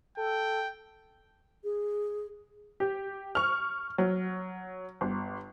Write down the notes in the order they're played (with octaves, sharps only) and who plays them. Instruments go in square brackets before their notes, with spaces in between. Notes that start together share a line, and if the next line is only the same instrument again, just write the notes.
[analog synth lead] A4 [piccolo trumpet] G5
[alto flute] G#4
[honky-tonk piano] G4
C#6 F6
F#3
G1